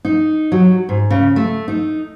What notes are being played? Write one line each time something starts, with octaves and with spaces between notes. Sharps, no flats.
D#4
F#3
G#2
C#3
A3
D#4